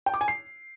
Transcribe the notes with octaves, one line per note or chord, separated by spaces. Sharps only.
G5
D6
G#5
C7